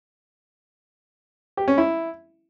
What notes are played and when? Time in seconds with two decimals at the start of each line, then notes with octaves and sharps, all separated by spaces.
1.57 G4
1.68 C#4
1.78 E4